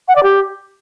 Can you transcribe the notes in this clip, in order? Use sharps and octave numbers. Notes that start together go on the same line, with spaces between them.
F#5
D5
G4